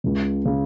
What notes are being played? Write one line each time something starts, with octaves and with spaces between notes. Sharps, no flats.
C#2 C#3
C#3